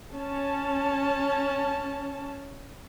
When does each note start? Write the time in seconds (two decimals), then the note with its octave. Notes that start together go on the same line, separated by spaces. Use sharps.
0.14 C#4 A5